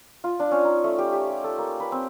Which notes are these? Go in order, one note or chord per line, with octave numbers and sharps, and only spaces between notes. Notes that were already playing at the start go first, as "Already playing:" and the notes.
F4
D4
C#4
D#4
A3
G4
G4
G4
A4
A#3
B4
C4